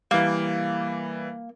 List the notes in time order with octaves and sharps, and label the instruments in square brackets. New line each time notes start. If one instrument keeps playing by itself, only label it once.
[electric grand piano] E3 G3 [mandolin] A#3